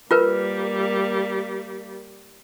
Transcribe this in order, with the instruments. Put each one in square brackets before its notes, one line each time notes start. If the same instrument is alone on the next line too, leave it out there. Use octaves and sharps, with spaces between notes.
[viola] G3 A#3 [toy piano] F4 A#4 B4